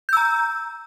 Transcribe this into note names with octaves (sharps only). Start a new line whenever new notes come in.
A#5 E6 G6